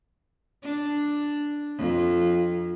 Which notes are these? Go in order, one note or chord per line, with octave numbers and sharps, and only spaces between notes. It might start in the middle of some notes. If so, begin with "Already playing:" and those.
D4
F2